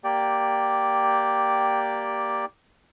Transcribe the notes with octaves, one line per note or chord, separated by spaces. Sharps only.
A#3 G4 D5 G5